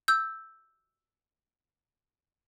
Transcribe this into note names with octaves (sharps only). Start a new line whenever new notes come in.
E6 G6